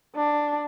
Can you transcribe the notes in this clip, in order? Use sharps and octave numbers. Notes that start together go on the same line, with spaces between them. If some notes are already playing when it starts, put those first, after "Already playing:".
D4